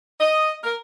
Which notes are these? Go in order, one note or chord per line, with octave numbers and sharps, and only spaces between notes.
D#5
A#4